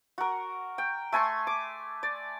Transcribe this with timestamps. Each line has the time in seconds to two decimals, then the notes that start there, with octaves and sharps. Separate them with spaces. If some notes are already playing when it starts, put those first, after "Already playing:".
0.18 F#4 A#4
0.78 G5
1.12 A3 G#5 C6 C#6
1.47 D6
2.03 D5